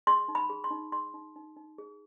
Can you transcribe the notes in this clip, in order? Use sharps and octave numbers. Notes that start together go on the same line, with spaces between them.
G#4 C6
D#4
B5
G#4
C6
D#4
G#4 C6
D#4
D#4
D#4
G#4